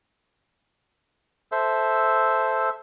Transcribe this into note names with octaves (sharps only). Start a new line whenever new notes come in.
A4 C5 E5